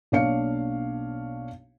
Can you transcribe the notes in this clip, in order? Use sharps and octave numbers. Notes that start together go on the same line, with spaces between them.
B1 A#3 D4 C#5 F5 C#7